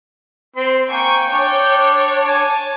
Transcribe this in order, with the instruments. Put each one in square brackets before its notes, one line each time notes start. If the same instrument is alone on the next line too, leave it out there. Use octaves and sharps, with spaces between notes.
[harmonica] C4 C6
[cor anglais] A#3 [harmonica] G5 [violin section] G#5 C#6
[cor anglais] D4 [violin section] C#5
[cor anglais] G#5 [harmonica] A5